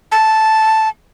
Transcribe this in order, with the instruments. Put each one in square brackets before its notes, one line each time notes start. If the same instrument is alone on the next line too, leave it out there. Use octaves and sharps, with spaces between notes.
[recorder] A5